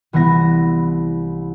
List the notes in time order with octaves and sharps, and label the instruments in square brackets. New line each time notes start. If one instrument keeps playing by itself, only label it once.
[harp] C2 E3 B3 E4 A#6